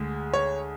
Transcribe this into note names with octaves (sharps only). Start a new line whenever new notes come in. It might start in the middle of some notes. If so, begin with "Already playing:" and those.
Already playing: D2 D3 G#3
C#5